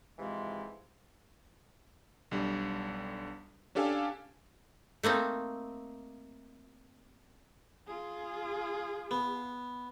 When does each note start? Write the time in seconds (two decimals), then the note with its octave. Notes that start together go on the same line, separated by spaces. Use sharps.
0.18 G#2 C3 E3 F3 G#3
2.31 B1 D3 G3
3.75 C#4 D4 G4 A4 F5 G#5
5.03 A3 A#3 C4 D#4
7.87 F4 G#4
9.11 B3